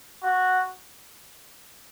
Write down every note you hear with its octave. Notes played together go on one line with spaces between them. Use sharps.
F#4